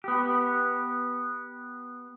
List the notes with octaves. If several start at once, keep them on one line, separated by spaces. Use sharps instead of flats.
B3 G4